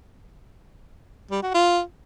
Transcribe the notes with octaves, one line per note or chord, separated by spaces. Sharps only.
G3
F#4
F4